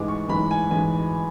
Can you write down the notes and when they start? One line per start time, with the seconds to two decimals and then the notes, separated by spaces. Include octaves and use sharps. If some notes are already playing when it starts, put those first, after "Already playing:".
Already playing: A1 G#2 E3 G#3 D6
0.08 C#6
0.28 A1 G#2 E3 G#3 B5
0.51 G#5
0.71 A1 G#2 E3 G#3 G#5